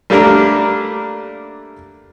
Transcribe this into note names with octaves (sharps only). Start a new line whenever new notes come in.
G3 A3 A#3 D4 A#4